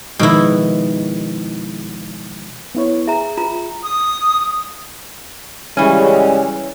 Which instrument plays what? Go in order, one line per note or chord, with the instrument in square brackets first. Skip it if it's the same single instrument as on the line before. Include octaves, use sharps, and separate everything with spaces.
[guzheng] B2 E4 [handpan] D#3 F3 G#3
[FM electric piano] B3 E4 C#5
[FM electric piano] G#4 [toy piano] E5 A#5
[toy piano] F4 A#5
[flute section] D#6
[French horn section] C#3 G3 G#3 [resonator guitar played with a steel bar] E3 C#4